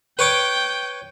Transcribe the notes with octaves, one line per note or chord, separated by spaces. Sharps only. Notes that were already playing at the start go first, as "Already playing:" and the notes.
B4 C#5 G5 D6